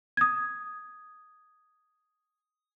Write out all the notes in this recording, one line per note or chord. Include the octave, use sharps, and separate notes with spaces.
D#6 G#6